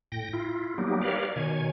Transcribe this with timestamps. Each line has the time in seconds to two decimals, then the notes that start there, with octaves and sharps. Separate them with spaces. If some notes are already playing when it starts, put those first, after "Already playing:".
0.12 A2 G5 A#6
0.33 E4 F4
0.78 F#3 G3 A#3 B3 D#4 G4
1.01 G4 A#4 B4 C#5 D5 F5
1.36 B2 D#3 C#5 G#5